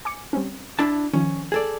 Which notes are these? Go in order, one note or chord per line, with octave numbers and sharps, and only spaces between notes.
G#5 D6 C#7
G3 C4 C#4
D4 E4 A5
D#3 F3 C#4
G#4 A4 D5